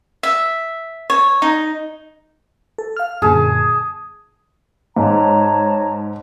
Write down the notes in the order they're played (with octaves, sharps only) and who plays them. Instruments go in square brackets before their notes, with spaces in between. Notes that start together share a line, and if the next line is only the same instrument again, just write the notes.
[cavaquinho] E5
C#5
D#4
[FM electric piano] A4
F5 F6
[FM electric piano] F#2 A#2 D3 [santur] G#4 A5
[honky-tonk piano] G#2 [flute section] C#5 A5 A#5